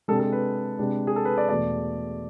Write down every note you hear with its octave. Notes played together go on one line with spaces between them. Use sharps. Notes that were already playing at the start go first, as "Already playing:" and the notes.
C3 G#3 D4 A4
A4
B4
C3 G#3 D4
G#4
A4
B4
D5
E2 B2 A3 D5